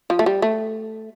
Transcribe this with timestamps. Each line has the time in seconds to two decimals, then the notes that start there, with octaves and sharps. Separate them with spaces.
0.10 F3
0.19 A3
0.26 G3
0.42 A3